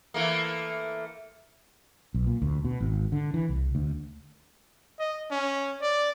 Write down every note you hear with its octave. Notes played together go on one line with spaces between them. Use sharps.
E3 A3 A#3
B1
A#2
D2
B2
G#1
D3
E3
C2
D2
D#5
C#4
D5